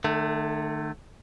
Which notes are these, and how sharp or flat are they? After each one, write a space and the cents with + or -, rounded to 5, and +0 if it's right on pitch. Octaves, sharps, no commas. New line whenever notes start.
D#3 -45 A3 +0